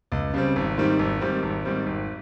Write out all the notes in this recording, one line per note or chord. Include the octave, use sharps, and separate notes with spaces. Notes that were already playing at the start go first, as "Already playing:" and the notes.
C#2
C#3 G3 C4
G#1
G#2 D#3 G3 C4
G#1
G#2 D#3 G3 C4
G#1
G#2 D#3 G3 C4
G#1